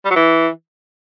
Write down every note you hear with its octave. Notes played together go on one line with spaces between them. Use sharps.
G3
F#3
E3